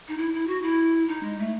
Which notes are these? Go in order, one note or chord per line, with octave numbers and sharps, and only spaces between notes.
D#4
E4
E4
F#4
E4
D#4
G#3
A3